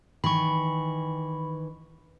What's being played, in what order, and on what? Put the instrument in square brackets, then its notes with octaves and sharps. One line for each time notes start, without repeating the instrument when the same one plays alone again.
[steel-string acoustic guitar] D#3 E3 [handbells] B5 C#6